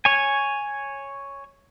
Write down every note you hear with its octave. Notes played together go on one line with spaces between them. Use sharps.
C#5 G#5